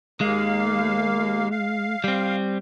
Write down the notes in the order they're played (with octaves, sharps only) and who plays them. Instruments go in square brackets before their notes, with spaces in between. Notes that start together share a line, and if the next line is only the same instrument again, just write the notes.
[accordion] D#2 A#3 F5 [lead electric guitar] G#3
[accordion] F5
[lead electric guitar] G3 C4